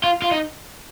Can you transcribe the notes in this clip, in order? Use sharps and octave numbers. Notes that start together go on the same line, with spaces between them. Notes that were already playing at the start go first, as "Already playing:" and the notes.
F4
F4
D#4